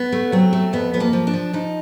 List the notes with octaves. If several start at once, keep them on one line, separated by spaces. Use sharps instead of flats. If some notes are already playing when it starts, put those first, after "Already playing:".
Already playing: B3
A3
F#3 C4
A3
F2 B3
F3 B3
A#3
F3
D4
F3
F3 D#4